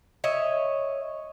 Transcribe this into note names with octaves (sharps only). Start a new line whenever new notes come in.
C#5 D#5 E5